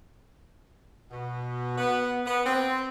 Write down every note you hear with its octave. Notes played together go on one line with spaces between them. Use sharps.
B2
B3
B3
C4